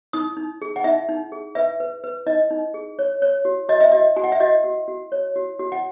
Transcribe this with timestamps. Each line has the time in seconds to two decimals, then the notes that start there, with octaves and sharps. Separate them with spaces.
0.13 D#4 D#6
0.37 D#4
0.62 G#4
0.76 F#5
0.84 D#4 E5
1.09 D#4
1.32 G#4
1.55 B4 E5
1.80 B4
2.04 B4
2.27 D#4 D#5
2.51 D#4
2.74 G#4
2.99 C#5
3.22 C#5
3.45 F#4
3.69 F#4 D#5
3.81 E5
3.92 F#4 D#5
4.16 F#4 G#5
4.24 F#5
4.32 E5
4.40 F#4 D#5
4.64 F#4
4.88 F#4
5.12 C#5
5.36 F#4
5.59 F#4
5.72 F#5